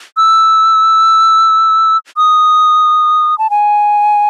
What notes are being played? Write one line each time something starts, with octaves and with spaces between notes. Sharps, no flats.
E6
D#6
A5
G#5